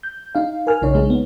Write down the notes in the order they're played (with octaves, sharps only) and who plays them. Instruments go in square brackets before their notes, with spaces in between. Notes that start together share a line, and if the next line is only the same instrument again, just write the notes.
[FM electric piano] G6
D#4 F5
A#4 G#5 F6
B1 C#3 D#4 C#5
G#3 D#4
B3